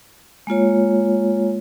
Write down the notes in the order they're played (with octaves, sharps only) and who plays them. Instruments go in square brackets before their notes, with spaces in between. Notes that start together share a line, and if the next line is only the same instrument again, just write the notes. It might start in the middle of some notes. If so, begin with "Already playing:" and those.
[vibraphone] G#3 A#3 F4 C#5